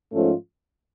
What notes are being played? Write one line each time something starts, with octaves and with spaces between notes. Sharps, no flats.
G#2 F3 A3 C#4 F4